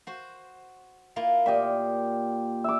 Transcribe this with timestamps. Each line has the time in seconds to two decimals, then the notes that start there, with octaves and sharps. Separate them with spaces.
0.07 F#4 C5
1.16 A#3 E4 F4
1.46 A#2 G4 D#5 E5
2.64 E5 D6